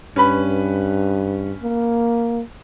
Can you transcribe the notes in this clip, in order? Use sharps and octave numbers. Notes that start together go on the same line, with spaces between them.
G2 C#4 B4 B5
A#3